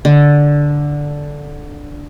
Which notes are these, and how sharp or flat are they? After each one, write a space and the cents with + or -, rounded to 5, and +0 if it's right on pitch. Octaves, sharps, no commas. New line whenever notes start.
D3 -5